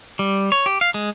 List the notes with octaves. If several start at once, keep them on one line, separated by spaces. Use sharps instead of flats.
G3
C#5
G4
F5
G#3